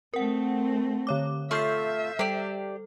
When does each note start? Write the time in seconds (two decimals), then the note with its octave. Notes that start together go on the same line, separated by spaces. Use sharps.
0.14 A3 C4 A#4 F#5
1.07 D3 C#5 D6
1.51 A3 F4 E5 F6 G6 C7
2.19 G3 G4 A4 D5